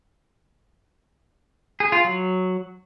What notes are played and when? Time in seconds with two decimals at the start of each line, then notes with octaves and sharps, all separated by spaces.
1.80 G#4
1.92 F4
2.04 F#3